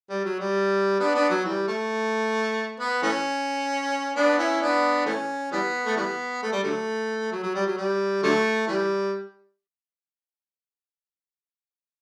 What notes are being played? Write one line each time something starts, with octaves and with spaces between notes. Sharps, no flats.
G3
F#3
G3
B3 D4
B3 D4
F#3
E3 G3
A3
B3
E3 A3 C#4
B3 D4
C#4 E4
B3 D4
E3 A3 C#4
E3 G3 B3
A3
E3 G3 B3
A3
G3
D3 F#3 A3
F#3
F#3
G3
F#3
G3
D3 F#3 A3
E3 G3